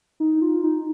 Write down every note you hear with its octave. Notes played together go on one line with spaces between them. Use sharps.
D#4
F4
D#4